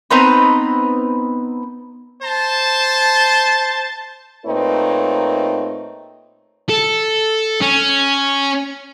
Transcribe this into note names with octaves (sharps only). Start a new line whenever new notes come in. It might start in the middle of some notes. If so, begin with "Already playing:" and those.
B3 C4 D#4 B4
C5 A5
A#2 A3 C4 D#4 B4 C#5
A4
C#4